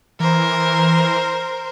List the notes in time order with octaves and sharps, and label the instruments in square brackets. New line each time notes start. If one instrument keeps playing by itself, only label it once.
[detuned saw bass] E3 [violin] A#4 C5